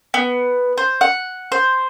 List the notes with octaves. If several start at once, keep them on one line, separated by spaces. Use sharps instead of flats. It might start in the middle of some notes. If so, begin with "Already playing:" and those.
B3
C5
F#5
C5